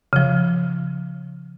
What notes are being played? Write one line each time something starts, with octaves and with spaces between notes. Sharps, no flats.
C#3 F3